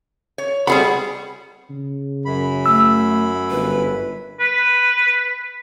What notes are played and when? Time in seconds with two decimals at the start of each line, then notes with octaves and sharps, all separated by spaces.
0.38 C#5
0.67 G3 B3 G#4 F#5 B5
1.70 C#3
2.25 F#2 B5
2.66 A3 E6
3.50 G1 B4
4.40 B4